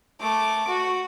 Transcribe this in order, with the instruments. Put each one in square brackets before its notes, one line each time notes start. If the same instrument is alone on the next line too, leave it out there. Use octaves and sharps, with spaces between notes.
[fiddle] A3 D6
F#4